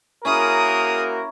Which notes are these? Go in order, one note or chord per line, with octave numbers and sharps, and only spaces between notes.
A#3 C#4 E4 F#4 G#4 A#4 A#5 D#6